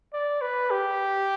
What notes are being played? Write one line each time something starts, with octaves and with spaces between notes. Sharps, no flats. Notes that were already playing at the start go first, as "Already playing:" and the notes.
D5
B4
G4